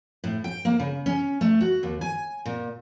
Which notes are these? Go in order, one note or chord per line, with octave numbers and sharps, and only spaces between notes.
A2
G5
A#3
C#3
C#4
A3
F#4
D#2
G#5
A#2